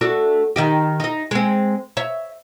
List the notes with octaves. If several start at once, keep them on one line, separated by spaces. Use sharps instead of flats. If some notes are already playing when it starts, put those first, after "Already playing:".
A3 D4 F#4
D#3 D#4 G4
D#4 D#5
G#3 C4
C#5 E5